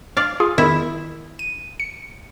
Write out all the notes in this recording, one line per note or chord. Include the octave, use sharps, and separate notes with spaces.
D5 F5
F4 G#4
E2 D#3 E4
D#7
C#7